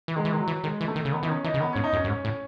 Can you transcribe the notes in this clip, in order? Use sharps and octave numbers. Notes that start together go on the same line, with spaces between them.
E3
D#3 G#3
E3
D#3
F#3
E3
D#3 G#3
E3
A3
D#3
C#3
D#3 B3
E3 D#4
D#3 C#4
E3 D#4
C#3
D#3 B3
G#2 C#4
D#4
F#2
C#4
F#2
G#2
A2